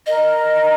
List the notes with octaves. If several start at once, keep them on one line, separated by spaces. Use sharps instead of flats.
A#4 D#5